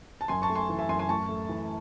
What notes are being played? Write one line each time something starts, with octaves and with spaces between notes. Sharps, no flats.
A5
F#2 G#5 C6
A5 C#6
A3
G#5 C6
E3
E5 G#5
F#2 G#5 C6
G#5 C6
A2 A5 C#6
A3
E3